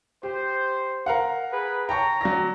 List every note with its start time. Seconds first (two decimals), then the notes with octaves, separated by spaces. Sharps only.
0.23 G4 C5
1.06 A#4 F5 F#5
1.52 G#4 B4
1.89 C#5 G5 A5 A#5 C#6
2.21 F#3 D5 A#6